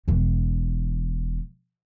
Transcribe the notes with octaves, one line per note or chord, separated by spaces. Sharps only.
E1 E3